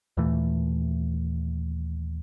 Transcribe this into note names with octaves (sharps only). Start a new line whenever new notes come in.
D#2 A#2 E3 A3